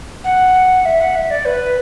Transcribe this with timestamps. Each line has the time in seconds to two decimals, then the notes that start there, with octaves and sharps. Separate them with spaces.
0.24 F#5
0.85 E5
1.01 F#5
1.15 E5
1.31 D5
1.45 B4